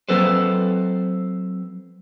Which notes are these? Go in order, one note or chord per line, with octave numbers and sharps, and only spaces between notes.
F#3 C4 A4 B4 C5